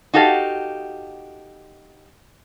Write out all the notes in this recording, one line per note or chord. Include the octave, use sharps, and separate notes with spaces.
D#4 F#4 G4 A4 F5